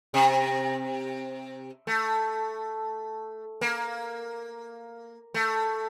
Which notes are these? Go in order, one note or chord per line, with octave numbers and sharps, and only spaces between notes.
C3
A3
A#3
A3